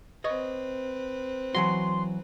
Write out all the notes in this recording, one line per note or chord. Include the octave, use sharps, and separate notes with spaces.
C4 B4 C#5 D#5
E3 F#3 F#4 C6